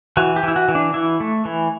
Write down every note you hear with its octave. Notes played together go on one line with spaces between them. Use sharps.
E3 F#4
G4
E3 E4
F#4
E3
D4
E3 E4
A3
E3